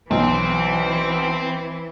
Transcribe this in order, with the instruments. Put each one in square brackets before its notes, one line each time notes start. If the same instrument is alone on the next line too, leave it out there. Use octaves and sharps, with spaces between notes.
[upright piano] B1 [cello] E3 [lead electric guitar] C4 C5